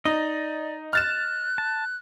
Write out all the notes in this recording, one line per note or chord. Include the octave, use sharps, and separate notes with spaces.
D#4 D5 D#5
F6 F#6 A6 E7
A5